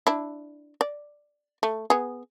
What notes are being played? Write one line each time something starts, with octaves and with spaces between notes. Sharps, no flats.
D4 E4
D5
A3
B3 G#4